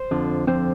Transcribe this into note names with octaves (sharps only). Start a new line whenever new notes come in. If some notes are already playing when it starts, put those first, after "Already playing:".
Already playing: C5
F2 D3 F3
F2 D3 F3 C4 C5